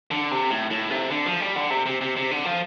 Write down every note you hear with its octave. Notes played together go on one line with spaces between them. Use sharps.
D3
C3
A2
A2
C3
D3
F3
G3
D3
C3
C3
C3
C3
D3
F3